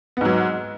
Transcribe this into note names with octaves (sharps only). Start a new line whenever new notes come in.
G#2 F#3 B3